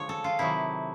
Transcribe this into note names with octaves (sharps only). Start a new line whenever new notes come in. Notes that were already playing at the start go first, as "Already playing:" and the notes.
Already playing: D3 F3 G#3 C#5
A4
F4
C3 D#3 F#3 E4